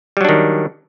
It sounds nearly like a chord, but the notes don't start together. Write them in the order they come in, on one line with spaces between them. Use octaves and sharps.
G3 F#3 D4 D#3